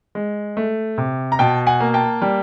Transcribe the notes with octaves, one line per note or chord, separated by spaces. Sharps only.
G#3
A3
C3
A#5
B2 G5 A5
F#5 G#5
A#3
G5 A5
G3